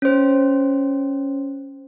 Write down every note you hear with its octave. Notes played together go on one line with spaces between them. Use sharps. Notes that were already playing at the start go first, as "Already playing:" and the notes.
C#4 C5